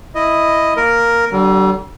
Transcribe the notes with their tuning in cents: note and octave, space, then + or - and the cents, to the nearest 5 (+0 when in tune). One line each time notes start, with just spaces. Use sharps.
E4 +0 D#5 +0
A#3 +0 A#4 +0
D3 +0 G3 -40